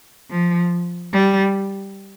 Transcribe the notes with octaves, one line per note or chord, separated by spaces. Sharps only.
F3
G3